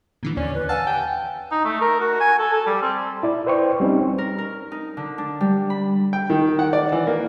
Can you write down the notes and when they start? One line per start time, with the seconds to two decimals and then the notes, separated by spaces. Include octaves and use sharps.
0.23 A#2 D3 E3
0.37 D#2 C#4 D5
0.54 B4
0.69 F5 F#5 G#5 A5 E6
0.87 G5
1.51 D#4
1.64 A3
1.81 A#4
2.00 F#4
2.20 G#5
2.39 A4
2.53 A4
2.66 G3
2.82 C4
3.23 E4 D5
3.47 B4 C5 D5 G5 C#6
3.80 G3 C4 C#4 D#4
4.18 A#4
4.38 A#4
4.72 D#4
4.97 D3
5.18 D4
5.41 G3
5.70 B5
6.13 G5
6.30 D#3
6.59 F#5
6.73 D5
6.92 E3
7.07 A#3